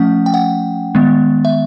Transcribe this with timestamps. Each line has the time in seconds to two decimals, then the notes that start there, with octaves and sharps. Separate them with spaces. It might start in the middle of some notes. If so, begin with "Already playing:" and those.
Already playing: F3 A3 C#4 F#5
0.26 G5
0.34 F#5
0.95 D#3 G#3 B3
1.45 E5